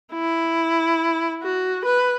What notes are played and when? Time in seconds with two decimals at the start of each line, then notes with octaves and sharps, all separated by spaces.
0.13 E4
1.42 F#4
1.85 B4